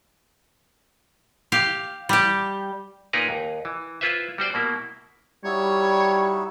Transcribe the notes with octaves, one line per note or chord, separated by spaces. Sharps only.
G4 F5
G3 G4
A#2 D#4 G#4 A#4 B4 A#5
D#2
E3
E4 F4 B4 C5 E5
G3 F#4 C5 D5
B2 A#3 E4
G3 D#4 E4 F#4 C#5